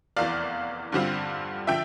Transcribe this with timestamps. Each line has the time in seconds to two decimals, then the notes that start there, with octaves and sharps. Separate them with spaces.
0.17 F1 E2 E3 D5 F5
0.92 G2 D3 G3 C4 F4
1.67 D3 F3 E5 G5